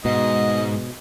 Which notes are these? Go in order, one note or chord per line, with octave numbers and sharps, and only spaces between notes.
G#2 B2 D#5